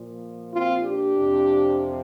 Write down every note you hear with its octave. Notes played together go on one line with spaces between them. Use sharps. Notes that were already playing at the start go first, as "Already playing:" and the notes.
Already playing: A#2 F3
C4 F4
D4 G4
F2 C3 F3